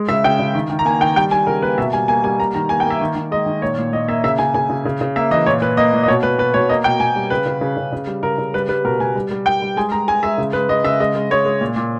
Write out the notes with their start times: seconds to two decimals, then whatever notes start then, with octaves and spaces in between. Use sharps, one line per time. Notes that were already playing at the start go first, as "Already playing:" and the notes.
Already playing: G#3
0.08 C#3 E5
0.24 C#3 G5
0.39 C#3
0.55 D#3
0.70 D#3
0.79 A#5
0.85 A#3 G#5
1.00 D#3 G5
1.16 G3 G5
1.31 G3 G#5
1.47 C#3 A#4
1.62 A#3 B4
1.78 B2 E5
1.93 G3 G#5
2.08 A#3 G#5
2.24 G3 G#5
2.39 A#3 A#5
2.54 D#3 A#5
2.69 A#3 G#5
2.80 G5
2.85 A#3
2.90 E5
3.01 D#3
3.15 D#3
3.31 G#3 D#5
3.46 D#3
3.62 A#2 C#5
3.78 A#2
3.93 A#2 D#5
4.08 A#3 E5
4.24 C#3 E5
4.38 C#3 G#5
4.54 C#3 G#5
4.70 C#3
4.85 C#3
5.01 C#3
5.16 A#3 E5
5.31 E3 D#5
5.46 A#2 C#5
5.62 A#2 B4
5.77 A#3 D#5
5.93 A#2
6.03 D#5
6.08 B2 C#5
6.23 B2 B4
6.38 B2 B4
6.54 B2 C#5
6.69 A#3 D#5
6.84 B2 G5
7.00 B2 G#5
7.16 G3
7.30 C#3 B4
7.46 C#3
7.61 C#3
7.77 C#3
7.92 C#3
8.07 G3
8.23 C#3 A#4
8.38 C#3
8.54 G3 B4
8.69 G3 B4
8.84 B2 A#4
9.00 B2 G#5
9.15 G3
9.31 G3
9.46 G3 G5
9.62 G3
9.77 G#3 G#5
9.92 G#3 A#5
10.08 G#3 G#5
10.23 G#3 E5
10.38 C#3
10.53 G#3 B4
10.69 G#3 D#5
10.84 C#3 E5
11.00 G#3 D#5
11.15 G#3
11.31 G#3 C#5
11.45 G#3
11.61 A#2
11.76 A#2